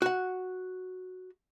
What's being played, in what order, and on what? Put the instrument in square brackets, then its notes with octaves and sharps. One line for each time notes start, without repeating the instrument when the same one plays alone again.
[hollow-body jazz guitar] F#4 F#5